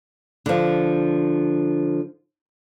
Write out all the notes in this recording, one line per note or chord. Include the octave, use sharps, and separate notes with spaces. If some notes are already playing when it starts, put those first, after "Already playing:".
D3 F3